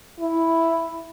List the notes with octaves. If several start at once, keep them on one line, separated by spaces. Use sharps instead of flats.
E4